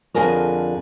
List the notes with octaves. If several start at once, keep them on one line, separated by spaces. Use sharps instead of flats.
F2 D3 G#4 A#4 C#5